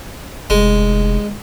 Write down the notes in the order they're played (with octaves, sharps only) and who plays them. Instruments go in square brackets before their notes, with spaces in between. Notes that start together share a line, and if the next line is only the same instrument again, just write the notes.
[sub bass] F1 [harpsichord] G#3